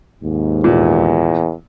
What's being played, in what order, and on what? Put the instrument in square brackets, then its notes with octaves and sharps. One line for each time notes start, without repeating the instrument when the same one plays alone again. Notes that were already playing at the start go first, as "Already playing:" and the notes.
[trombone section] D#2 G#2
[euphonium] E2 [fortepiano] A#2